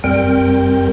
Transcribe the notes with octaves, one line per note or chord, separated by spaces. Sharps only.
F#2 G3 C4 A#4 G5